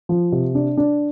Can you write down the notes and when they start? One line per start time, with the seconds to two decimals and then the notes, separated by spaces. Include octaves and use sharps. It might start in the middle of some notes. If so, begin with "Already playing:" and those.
0.09 F3
0.32 C3
0.55 D4
0.77 D4